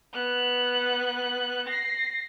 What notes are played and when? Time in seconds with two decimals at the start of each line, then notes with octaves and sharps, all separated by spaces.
0.13 B3 F#6
1.67 A#6 C7